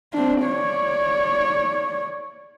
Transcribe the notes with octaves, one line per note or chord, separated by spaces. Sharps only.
C4 D4
C#5 D5